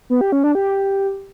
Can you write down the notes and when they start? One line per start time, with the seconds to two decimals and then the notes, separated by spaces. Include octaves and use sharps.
0.10 B3
0.21 G4
0.32 C#4
0.44 D4
0.55 G4